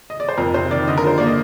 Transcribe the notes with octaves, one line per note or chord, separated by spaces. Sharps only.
D#5
D5
C5
F2 A#4
C3 C5
D#3 D5
D3 D#5
A#4
F3 C5
A#3 D5
D#5